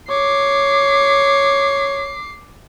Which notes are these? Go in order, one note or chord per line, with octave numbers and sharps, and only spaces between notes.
C#5 D6 C7